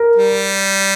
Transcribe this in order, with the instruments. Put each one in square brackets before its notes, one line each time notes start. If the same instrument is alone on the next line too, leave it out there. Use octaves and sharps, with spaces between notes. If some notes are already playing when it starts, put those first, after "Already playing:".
Already playing: [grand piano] A#4
[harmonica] G3